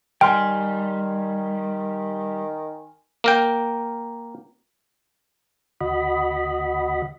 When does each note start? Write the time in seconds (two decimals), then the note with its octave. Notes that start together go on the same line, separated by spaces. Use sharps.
0.21 D#3 G3 G5 G#5 C6 F6
3.24 A#3 A#4 G5
5.81 D2 F#4 D#5 B5